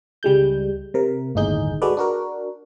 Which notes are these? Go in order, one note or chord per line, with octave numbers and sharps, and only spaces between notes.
C#2 G3 G#3 G6
C3 A#4
G1 D#2 A2 D#4 G#4 G6
G#3 F#4 A4 B4 D5
D4 F#4 A#4